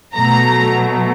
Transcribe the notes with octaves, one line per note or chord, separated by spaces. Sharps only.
B2 F#3 A3 A#5